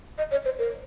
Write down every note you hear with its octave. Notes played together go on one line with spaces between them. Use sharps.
D#5
C#5
C5
A#4